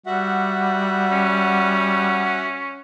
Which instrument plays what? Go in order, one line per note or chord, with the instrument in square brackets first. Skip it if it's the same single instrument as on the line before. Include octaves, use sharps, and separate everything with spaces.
[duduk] G3 [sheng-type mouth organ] F#4 E5 F#5
[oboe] C#4